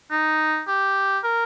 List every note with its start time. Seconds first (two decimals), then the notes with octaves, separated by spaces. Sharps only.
0.11 D#4
0.68 G4
1.24 A#4